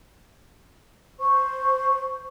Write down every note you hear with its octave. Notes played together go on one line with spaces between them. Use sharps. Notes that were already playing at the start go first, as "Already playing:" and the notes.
C5 C#6